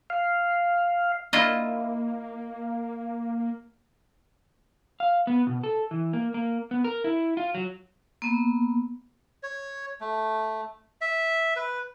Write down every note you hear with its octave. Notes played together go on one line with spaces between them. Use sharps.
F5
A#3 E4 F4 D#5
F5
B3
B2
A4
E3
A#3
A#3
B3
A#4
E4
F4
F#3
A#3 B3
C#5
A3
E5
B4